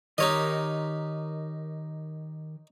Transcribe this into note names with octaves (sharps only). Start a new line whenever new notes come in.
D#3 D#4 G4 A#4 C#5 D#5